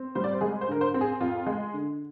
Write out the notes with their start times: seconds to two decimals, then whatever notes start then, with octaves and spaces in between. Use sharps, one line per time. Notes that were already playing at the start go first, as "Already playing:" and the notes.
Already playing: C4
0.15 G3 C5
0.24 D5
0.32 C5
0.41 G#3 G#4
0.61 C5
0.68 D3 A#4
0.81 C5
0.94 C4
1.01 G#4
1.21 F2 F4
1.46 G#3
1.73 D3